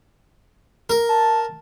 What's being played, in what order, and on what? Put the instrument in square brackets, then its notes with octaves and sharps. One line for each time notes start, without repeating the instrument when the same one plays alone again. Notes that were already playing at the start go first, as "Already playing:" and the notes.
[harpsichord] A#4
[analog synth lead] A5